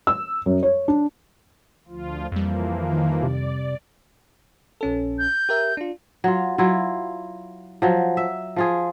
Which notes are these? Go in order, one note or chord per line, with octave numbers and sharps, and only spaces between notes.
E6
F#2
C#5
D4
D2 F3 F4
F2 E3 F3 G3 A#3
D#3
C3 D5
A#1 C#4 A4
G6
G4 A#4 E5
D4 F4
F#3 F4
F#3 E4 F4
F3 F#3
E5
F3 F4 G#4